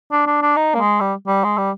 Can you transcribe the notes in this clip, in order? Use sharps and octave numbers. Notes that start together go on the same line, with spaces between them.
D4
D4
D4
D#4
A#3
G#3
G3
G3
G#3
G3